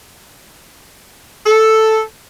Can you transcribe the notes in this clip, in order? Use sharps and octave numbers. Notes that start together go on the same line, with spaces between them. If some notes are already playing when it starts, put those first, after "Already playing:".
A4